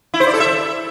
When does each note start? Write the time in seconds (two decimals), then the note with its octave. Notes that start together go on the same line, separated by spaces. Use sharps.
0.14 E4
0.20 C5
0.27 D5
0.33 A4
0.40 E5